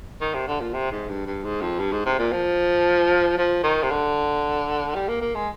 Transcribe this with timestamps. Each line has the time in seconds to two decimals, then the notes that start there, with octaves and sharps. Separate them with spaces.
0.21 D#3
0.34 C3
0.47 D3
0.61 A#2
0.74 C3
0.91 G#2
1.09 G2
1.26 G2
1.44 G#2
1.61 F2
1.79 G2
1.92 G#2
2.06 C3
2.19 A#2
2.32 F3
3.37 F3
3.63 D#3
3.83 C3
3.90 D3
4.95 G3
5.08 A#3
5.22 A#3
5.35 G#3